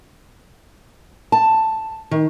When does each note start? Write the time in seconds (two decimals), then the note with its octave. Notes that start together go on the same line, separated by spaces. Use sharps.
1.32 A5
2.11 D#3